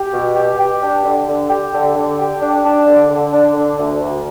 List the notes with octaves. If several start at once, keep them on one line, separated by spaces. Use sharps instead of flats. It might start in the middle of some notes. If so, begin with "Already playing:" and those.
Already playing: G4
B2
G4
G4
D4
D3
D3
G4
D3
D3
G4
D4
D4
D3
D3
D4
D3
D2
D2